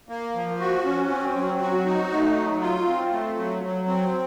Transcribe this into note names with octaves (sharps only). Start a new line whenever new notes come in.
A#3
F3
F#4
C#4
C4
F#3
F#4
D#4
A3
F#3
F4
C4
A3
F#3
F#3
C4